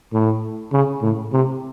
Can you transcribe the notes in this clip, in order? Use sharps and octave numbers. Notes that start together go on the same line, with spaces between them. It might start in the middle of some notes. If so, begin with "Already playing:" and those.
A2
C#3
A2
C3